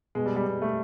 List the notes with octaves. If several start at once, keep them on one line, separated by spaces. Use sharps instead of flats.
B2 G#3
G3
G3
B2 G3
A3